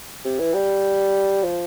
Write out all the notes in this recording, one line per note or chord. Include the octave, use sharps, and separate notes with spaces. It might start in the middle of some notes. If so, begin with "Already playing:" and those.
C3
E3
G3
F3